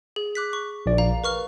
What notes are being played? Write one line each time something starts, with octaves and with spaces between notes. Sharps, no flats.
G#4
D6 F#6 B6
C#6
A#1 D5
F5 A#5
A#4 B4 C#6 F6